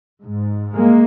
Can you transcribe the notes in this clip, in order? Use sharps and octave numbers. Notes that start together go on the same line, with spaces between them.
G#2
G#3 A#3